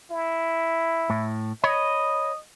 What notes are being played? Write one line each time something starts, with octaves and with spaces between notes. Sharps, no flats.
E4
A2
C#5 D#5 B5